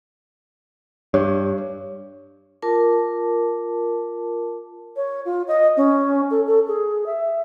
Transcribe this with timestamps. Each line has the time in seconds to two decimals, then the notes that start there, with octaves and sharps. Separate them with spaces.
1.14 G2 C#5
2.62 F4 A#4 A5 D6
4.96 C#5
5.25 F4
5.48 D#5
5.77 C#4
6.31 A4
6.47 A4
6.68 G#4
7.06 E5